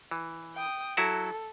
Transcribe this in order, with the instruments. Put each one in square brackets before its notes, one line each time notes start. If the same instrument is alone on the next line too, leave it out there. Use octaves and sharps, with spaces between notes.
[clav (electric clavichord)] E3
[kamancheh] G5 D#6
[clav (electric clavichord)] F#3 E4 F#4 [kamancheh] A4